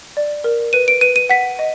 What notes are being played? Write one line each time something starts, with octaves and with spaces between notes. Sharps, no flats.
D5
A#4
B4 D#7
D7
B4 D#7
D#7
F#5 B6
D#5